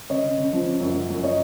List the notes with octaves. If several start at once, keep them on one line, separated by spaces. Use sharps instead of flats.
C#3 C#5 D#5
C#3
C#3
F3
C#3
F#2
F#2
F#2
C#5 D#5